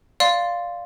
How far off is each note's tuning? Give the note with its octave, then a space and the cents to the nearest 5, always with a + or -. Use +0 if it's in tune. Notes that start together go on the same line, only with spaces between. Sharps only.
D5 +0 F5 +0 C6 +0